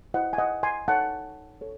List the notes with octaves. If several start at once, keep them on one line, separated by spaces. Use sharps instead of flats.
E4 C5 D#5 F#5
G#5
D#5 F#5
G#5 C6
D#4 A4 C#5 F#5 A5
A4 C#5